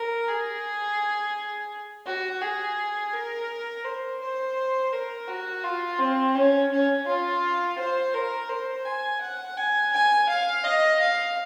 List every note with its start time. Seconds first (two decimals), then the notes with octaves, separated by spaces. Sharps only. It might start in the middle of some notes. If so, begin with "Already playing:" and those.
Already playing: A#4
0.27 G#4
2.06 F#4
2.42 G#4
3.13 A#4
3.84 C5
4.20 C5
4.92 A#4
5.28 F#4
5.63 F4
5.99 C4
6.35 C#4
6.71 C#4
7.06 F4
7.78 C5
8.14 A#4
8.49 C5
8.85 G#5
9.21 F#5
9.57 G#5
9.93 G#5
10.29 F5
10.64 D#5
11.00 F5